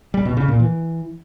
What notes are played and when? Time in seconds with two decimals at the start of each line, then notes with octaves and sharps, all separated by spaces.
0.14 G3
0.25 B2
0.37 C#3
0.48 A#2
0.60 E3